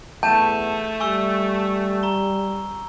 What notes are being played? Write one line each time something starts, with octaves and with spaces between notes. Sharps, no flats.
E2 A3 A5 G6 D#7 E7
G3 G#5 C#6 E6
A#5 G7